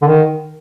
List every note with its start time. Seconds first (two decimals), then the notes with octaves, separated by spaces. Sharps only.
0.02 D3
0.07 D#3